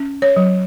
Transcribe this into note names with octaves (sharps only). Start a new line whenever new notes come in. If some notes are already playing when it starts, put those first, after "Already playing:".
Already playing: C#4
C#5
F#3